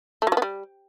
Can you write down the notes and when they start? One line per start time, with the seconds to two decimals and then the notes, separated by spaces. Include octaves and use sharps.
0.22 A3
0.27 F#3
0.32 F3
0.37 B3
0.42 G3